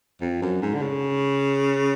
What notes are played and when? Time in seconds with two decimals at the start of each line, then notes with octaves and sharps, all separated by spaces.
0.21 F2
0.42 F#2
0.62 G#2
0.74 D3
0.82 C#3